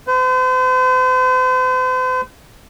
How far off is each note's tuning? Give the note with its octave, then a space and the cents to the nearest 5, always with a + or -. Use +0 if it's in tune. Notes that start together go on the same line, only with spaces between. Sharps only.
C5 -45